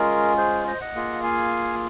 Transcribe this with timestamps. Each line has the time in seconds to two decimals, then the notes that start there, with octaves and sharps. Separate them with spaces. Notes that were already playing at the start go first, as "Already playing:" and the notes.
Already playing: G#3 C#4 F4 G#4 A#4
0.38 G#4 C5
0.67 C5 D#5
0.81 D#5 F#5
0.95 A#3 F4 G#4
1.23 F5 G#5